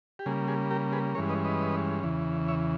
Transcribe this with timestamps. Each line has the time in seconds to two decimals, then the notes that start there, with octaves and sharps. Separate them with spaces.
0.19 G4
0.26 C#3 G3 A#3 G#4
0.48 G#4
0.71 G4 A#4
0.92 G#4 B4
1.15 G2 E3 G#3 C#4 A#4 C#5
1.29 B4 D#5
1.45 B4 D#5
2.03 E2 C#3 E3
2.48 C#5 E5